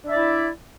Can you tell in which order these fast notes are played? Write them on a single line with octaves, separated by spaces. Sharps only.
D4 E5 D5 E4